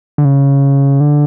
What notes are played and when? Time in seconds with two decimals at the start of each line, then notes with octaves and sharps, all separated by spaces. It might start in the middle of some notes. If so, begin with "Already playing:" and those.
0.18 D3
0.25 C#3
1.00 D3